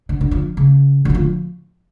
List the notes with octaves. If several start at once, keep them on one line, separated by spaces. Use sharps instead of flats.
D3
D3
F3
C#3
D3 F#3
F3